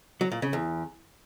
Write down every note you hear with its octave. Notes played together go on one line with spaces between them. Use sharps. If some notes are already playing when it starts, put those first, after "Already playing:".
F#3
A#2
C#3
E2